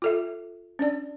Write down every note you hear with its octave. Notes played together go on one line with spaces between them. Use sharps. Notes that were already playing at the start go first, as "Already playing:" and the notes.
F4 A4 E5
C#4 D4 D5